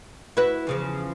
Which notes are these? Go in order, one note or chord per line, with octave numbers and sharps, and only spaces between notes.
E4 F#4 B4
E2 C#3 F3